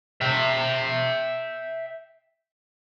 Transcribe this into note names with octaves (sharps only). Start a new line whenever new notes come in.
E5 G5